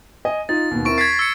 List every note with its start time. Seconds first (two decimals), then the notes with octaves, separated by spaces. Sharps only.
0.25 D#5 G#5
0.49 D#4 F4 A6
0.71 D#2 B2
0.85 C4 E4 A#4 C#6 D7
0.98 G#6 A6 B6 C7
1.19 E6 C#7